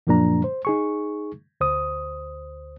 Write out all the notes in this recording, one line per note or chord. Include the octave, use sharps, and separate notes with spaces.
F#2 A#2 F3 A#3 D4 A#5
C5
D#4 G#4 C#6
D2 C5 D#6